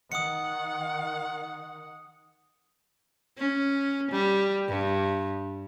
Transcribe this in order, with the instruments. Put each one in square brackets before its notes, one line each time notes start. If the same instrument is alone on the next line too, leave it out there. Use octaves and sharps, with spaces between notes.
[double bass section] D#3 [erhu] F#5 [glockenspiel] D#6 C#7
[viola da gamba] C#4
G3
G2